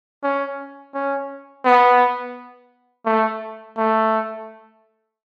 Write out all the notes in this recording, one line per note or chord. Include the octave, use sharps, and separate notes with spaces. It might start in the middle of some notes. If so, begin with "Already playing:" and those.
C#4
C#4
B3
A3
A3